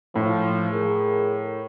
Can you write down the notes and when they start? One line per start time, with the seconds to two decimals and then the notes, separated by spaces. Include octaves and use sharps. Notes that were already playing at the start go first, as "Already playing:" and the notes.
0.16 A2 F3
0.71 G#4 A#4